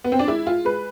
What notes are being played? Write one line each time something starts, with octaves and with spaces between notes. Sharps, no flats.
B3
C4
D4
G#3 E4
F4
G#3 B4